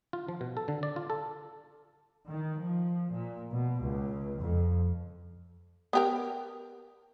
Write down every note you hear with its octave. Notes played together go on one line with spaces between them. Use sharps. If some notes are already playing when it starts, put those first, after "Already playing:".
F4
F3
B2
A4
D3
D5
F4
A4
D#3
F3
A#2
B2
C#2
F2
B3 G4 A#4